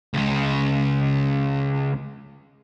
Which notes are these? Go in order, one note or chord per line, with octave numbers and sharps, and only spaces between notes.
C#2 C#3